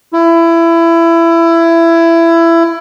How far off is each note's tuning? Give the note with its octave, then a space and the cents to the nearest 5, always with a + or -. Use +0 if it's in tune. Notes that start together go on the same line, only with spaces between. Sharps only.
E4 +20